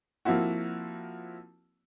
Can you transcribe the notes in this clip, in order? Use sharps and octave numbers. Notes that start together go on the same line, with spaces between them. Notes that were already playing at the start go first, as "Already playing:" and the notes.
F3 A#3 C4 E4 F#4